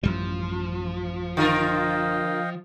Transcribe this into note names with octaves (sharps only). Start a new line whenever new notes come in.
A1 F#2 F3 G3
D3 F4 A#4 D#5 F5 G5